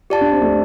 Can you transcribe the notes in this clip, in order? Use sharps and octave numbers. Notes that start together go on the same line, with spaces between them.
F4 G4 D5 A5
D4
C4
A3 D4